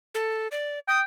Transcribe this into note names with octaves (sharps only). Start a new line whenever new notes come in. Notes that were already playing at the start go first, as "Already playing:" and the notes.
A4
D5
G5 D#6